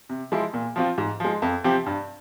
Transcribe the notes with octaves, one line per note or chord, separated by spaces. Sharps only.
C3
F3 G#3 E4
A#2
F3 C4 F4
G#2
F3 G#3
F2
C3 F3 C4 G4
G2